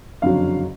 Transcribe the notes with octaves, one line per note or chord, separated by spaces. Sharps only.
F#1 F2 D3 F#3 F5